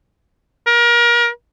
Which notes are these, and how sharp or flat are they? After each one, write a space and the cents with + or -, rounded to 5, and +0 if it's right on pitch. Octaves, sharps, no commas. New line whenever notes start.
A#4 +30